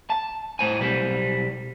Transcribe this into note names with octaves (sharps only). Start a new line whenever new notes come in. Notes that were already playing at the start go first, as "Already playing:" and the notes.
A5
A2 C5 G#5
B1 G3 C5